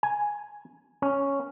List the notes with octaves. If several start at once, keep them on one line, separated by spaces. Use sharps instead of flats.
G#5
C#4